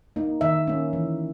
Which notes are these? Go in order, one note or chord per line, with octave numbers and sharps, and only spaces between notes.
A#3 D#4
D#3 E5
A#3 C#4
E3